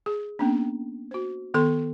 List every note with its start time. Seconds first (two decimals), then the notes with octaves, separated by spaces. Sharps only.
0.06 G#4
0.39 A#3 B3 C#4 D4
1.11 F#4 C5
1.54 D#3 B3 A4 C6